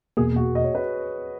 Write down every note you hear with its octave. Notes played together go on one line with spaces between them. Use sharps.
E2 B2 A#3 G#4
F#4
D#5
C#5
B4